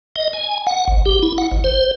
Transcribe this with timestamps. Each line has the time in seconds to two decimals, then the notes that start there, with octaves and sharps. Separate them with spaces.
0.16 D#5
0.33 G#5
0.67 F#5
0.88 G#1
1.06 G4
1.23 E4
1.38 F#5
1.51 G#1
1.64 C5